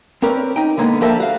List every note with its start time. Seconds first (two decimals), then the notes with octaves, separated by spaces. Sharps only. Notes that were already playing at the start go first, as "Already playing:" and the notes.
0.22 C4 C#4 A#4 B4 D5
0.56 D#4 G5
0.77 D3 G#3 A#3 B3
1.01 F3 G3 A#3 A4 A#4 E5
1.20 F#4 F5